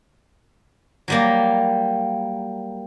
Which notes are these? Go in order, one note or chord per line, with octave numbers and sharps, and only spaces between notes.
F#3 G3 A#3